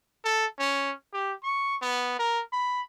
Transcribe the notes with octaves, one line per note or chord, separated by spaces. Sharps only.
A4
C#4
G4
C#6
B3
A#4
B5